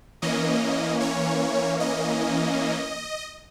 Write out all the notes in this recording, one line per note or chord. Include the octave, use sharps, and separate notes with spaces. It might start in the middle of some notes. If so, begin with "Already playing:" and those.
E3 A#3 C#4 D#5
C#5
D#5